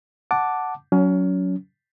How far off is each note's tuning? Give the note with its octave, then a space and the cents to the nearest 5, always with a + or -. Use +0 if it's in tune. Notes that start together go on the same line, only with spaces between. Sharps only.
F#5 +0 A5 +0 D6 +0
F#3 +0 C#4 +25